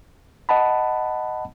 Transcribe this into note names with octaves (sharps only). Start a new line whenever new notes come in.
D#5 F#5 A5 B5